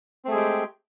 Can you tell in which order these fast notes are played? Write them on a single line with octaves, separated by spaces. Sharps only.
C4 A3 G#4 G#3 G4